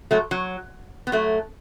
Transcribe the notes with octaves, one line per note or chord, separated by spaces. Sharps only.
F#3 A3
F#3
B3
F#3 A3